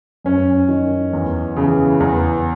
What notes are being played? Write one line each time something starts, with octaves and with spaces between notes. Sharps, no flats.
F#2 C#4
D#3
E2
C#3 E3
E2